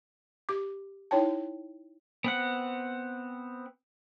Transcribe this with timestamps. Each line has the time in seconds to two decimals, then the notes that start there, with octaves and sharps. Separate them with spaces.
0.49 G4 D6
1.11 D#4 E4 C#5 G5 A5
2.24 B3 C4 F#5